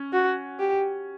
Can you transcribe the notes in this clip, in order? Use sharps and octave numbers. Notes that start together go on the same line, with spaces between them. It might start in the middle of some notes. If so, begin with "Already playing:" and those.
Already playing: C#4
F#4
G4